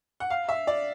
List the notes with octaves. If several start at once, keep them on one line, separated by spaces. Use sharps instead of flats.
F#5
F5
E5
D5